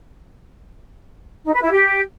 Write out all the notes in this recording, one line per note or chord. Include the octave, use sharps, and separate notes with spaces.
D#4
B4
E4
G4